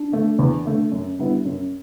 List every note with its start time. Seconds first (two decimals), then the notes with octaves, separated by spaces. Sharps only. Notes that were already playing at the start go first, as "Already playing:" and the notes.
Already playing: D4
0.12 D3 A3
0.39 E2
0.65 D3 A3
0.92 F#2
1.19 D3 G3 B3 E4
1.45 F#2